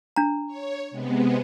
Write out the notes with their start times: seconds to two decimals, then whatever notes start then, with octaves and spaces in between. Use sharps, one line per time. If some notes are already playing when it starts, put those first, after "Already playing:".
0.16 D4 A#5
0.47 C#5
0.91 C3 G#3 B3